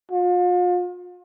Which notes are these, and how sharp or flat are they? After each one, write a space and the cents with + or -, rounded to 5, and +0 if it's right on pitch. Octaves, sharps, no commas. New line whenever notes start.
F4 +40